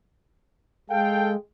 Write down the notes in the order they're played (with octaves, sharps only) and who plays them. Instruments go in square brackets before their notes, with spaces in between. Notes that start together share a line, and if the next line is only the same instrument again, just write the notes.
[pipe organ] G#3 [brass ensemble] A4 F5 G5